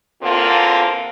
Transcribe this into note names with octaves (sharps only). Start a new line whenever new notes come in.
E2 D3 A#3 C4 F4